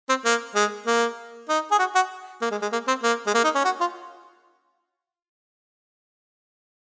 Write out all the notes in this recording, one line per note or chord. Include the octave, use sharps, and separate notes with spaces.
C4
A#3
G#3
A#3
D#4
G#4
F#4
F#4
A#3
G#3
G#3
A#3
C4
A#3
G#3
A#3
D#4
C#4
F#4
F4